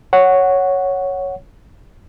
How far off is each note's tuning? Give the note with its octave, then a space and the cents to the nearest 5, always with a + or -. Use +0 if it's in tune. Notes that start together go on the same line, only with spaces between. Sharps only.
C#5 +0 F#5 +0